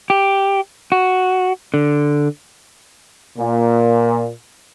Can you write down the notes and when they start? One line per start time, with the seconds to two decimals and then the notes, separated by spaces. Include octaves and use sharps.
0.10 G4
0.92 F#4
1.74 D3
3.38 A#2